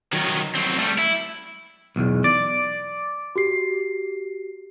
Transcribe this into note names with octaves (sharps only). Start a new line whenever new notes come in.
D#3 F#3
F#3 C4
G3 A3
E4
B1 E2
D5
F#4 G4 C7